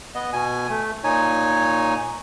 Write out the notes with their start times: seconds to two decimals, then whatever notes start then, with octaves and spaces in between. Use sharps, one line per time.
0.15 B3 D#5
0.33 B2 G#5
0.70 A3
1.04 A#2 D#4 C#5 G#5